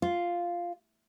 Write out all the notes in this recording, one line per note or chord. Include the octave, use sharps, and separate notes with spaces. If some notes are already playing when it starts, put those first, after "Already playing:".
F4